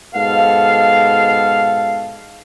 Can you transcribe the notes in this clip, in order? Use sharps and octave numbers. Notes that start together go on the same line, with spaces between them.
G#2 B2 A4 F5